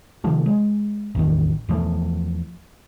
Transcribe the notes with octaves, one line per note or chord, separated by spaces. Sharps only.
C3 D#3 F3 A3
G#3
A1 E2 D#3
E2 E3 F3 A3